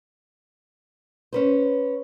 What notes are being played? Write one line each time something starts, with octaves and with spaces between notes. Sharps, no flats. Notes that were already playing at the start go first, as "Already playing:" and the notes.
C#4 B4 C5